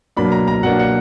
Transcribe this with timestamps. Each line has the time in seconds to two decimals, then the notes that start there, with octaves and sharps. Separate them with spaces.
0.17 B2 F#3 A#3 D4 B5
0.32 A#5
0.48 A#5
0.63 B2 F#3 A#3 D4 F#5
0.79 F#5